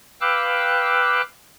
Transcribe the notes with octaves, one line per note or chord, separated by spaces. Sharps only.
B4 F5 G5 D6 E6 F#6